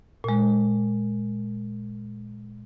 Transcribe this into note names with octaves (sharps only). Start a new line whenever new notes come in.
A#2 G#3